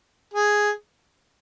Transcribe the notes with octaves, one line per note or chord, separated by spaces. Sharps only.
G#4